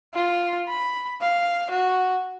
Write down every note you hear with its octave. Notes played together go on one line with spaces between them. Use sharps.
F4
B5
F5
F#4